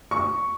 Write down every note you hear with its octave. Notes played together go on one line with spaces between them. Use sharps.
C#6